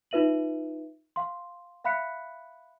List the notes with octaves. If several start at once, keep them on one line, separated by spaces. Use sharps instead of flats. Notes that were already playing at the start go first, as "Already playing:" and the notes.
D#4 F4 B4 E5 D#7 F#7
F5 C6
E5 F5 B5 F#6 B6 C#7